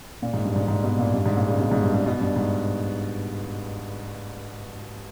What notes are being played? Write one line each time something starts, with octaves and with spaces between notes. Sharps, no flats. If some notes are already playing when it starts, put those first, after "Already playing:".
A#2
G#2
G2
G#2
G#2
B2
A#2
G2
G#2
A#2
C#3
B2
G#2
G2
G#2
B2
G2
G#2